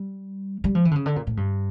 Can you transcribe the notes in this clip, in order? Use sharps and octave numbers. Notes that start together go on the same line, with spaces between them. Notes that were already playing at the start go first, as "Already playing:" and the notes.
Already playing: G3
G3
F3
E3
D3
C#3
D3
A#2
A2
G2